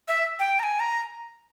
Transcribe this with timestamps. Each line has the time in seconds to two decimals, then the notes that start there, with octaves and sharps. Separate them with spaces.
0.08 E5
0.39 G5
0.59 A#5
0.63 G#5
0.80 A#5